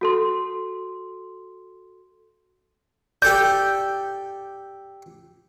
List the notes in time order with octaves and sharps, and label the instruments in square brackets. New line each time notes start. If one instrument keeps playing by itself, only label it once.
[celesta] F#4 A4 C6
[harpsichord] G4 A4 D5 [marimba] G6